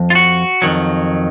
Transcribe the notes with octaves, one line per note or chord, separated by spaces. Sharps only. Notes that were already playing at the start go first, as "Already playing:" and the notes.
Already playing: F2 F3
F4
F#4
F2 D#3 F#3